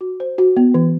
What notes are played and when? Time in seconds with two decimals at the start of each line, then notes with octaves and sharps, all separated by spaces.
0.01 F#4
0.20 C5
0.38 F#4
0.57 B3
0.74 E3